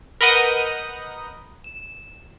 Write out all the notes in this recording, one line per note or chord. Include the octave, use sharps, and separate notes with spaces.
A#4 B4 D#5 F#5 D#6 G6
E7